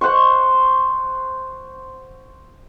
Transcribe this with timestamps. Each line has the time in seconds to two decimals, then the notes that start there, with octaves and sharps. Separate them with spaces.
0.01 C5 F#5 C6 C#6